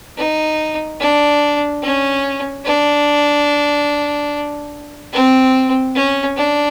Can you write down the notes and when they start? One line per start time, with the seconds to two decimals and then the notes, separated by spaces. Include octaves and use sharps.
0.18 D#4
1.01 D4
1.83 C#4
2.66 D4
5.13 C4
5.95 C#4
6.37 D4